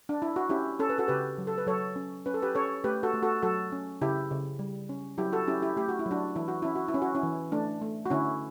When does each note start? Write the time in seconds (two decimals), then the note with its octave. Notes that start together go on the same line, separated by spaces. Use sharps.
0.09 D4
0.22 E4
0.36 F#4
0.49 C#4 E4 G4
0.79 C#4 A4
0.89 B4
0.98 F#4 A4
1.08 C#3 G4 B4
1.38 F#3
1.47 A4
1.58 B4
1.66 F#3 A4 C#5
1.96 C#4
2.26 C#4 B4
2.34 A4
2.42 G4 B4
2.55 C#4 A4 C#5
2.84 A3 G4 B4
3.03 F#4 A4
3.14 A3
3.23 F#4 A4
3.43 F#3 F#4 A4
3.72 C#4
4.01 C#3 E4 G4
4.31 C#3
4.59 G3
4.89 C#4
5.18 F#3 E4 G4
5.32 F#4 A4
5.47 C#4 E4 G4
5.62 E4 G4
5.76 A3 G4
5.89 F#4
5.99 E4
6.06 F#3
6.11 D4 F#4
6.36 E3 E4
6.48 F#4
6.62 C#4 E4
6.76 F#4
6.88 E4
6.94 C#4
7.02 F#4
7.15 C#4 E4
7.23 E3
7.52 A3 D4
7.82 A3
8.06 F#4
8.10 D3 C#4 E4